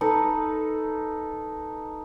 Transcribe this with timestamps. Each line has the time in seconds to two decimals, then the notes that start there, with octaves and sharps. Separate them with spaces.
0.01 D#4 A4 B4